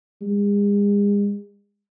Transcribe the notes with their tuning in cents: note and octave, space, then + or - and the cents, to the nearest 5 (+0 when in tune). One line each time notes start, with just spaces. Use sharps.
G#3 -40